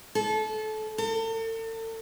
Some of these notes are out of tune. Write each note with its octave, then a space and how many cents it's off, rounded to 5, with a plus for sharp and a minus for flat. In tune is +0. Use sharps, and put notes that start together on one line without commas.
A4 -25
A4 +40